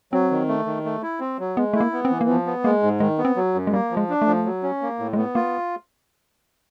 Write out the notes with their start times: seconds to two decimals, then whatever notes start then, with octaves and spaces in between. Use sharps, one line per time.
0.12 F#3 C4
0.31 D#3
0.48 A3
0.66 D#3
0.85 A3
1.03 E4
1.20 C4
1.39 F#3
1.57 G#3 B3
1.73 A3 E4
1.80 A#3
1.93 B3
2.05 C4
2.10 E3
2.21 A#3
2.28 F3 B3
2.46 B3
2.64 G#3 A#3
2.83 G#2
3.00 D#3 G#3
3.18 B3
3.25 C4
3.36 F#3
3.54 F#2
3.67 G#3
3.72 G3 A#3
3.91 F3
3.97 G#3
4.10 D4
4.22 F3 A3
4.45 F#3
4.63 C#4
4.82 A#3
4.99 A2
5.13 G#3
5.17 A3 B3
5.35 A#3 F4